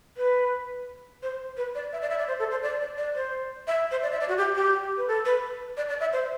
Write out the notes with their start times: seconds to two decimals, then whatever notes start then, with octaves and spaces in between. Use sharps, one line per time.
0.17 B4
1.23 C5
1.57 B4
1.75 D5
1.92 E5
2.02 D5
2.10 E5
2.18 D5
2.28 C5
2.39 A4
2.51 C5
2.63 D5
2.80 D5
2.97 D5
3.15 C5
3.67 E5
3.91 C5
4.03 D5
4.12 E5
4.20 D5
4.29 F#4
4.37 G4
4.55 G4
4.97 B4
5.08 A4
5.25 B4
5.77 D5
5.89 D5
6.00 E5
6.13 C5